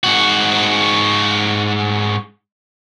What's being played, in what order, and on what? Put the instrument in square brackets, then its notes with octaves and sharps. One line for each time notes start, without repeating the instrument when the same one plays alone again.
[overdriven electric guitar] G#2 F#4